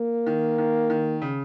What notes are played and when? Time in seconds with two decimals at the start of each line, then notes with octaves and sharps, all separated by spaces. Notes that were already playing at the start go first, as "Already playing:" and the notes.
Already playing: A#3
0.26 D#3
0.58 D#3
0.90 D#3
1.22 C#3